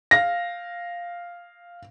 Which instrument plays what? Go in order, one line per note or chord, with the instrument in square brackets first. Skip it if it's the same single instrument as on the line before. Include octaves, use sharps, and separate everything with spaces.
[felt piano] F5 A#6